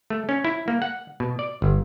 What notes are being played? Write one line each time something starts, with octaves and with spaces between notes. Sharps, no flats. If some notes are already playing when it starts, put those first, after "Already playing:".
A3
C#4
E4
A#3
F#5
B2
D5
G1